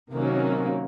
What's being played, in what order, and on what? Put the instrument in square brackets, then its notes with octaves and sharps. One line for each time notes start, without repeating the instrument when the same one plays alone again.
[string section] C3 D#3 F#3 A#3 C#4